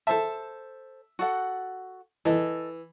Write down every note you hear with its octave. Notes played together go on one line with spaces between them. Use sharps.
A4 C5 E5 A5
F#4 A4 F#5
E3 A4 D#5